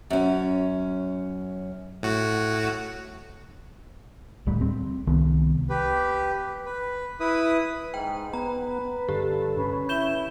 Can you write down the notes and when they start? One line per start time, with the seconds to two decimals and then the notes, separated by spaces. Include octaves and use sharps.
0.10 F#2 C#4
2.03 A2 F#4
4.46 D1 D2 G3
4.61 C4
5.07 C2 D#3 B3
5.70 G4 B4
6.66 B4
7.20 E4 B4 D#6
7.94 G#2 G5
8.33 B3 B4 A#5
9.09 G2 D3 G4 A4
9.58 C#4 B4
9.89 E4 G6 E7 G7